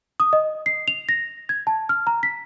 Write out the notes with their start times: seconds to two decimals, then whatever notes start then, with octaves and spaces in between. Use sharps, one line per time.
0.20 D#6
0.33 D#5
0.66 C7
0.88 F7
1.09 A#6
1.49 G#6
1.67 A5
1.89 F6
2.07 A#5
2.23 B6